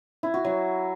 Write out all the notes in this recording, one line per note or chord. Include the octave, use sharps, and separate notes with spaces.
E4
F#4
F#3